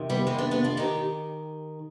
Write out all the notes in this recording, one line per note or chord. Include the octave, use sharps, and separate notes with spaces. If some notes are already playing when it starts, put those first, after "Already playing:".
Already playing: F2 C3 D#3
G3 B3
G#3 C4
B3 D4
B3 D4
D4 F4
D#3 D#4 G4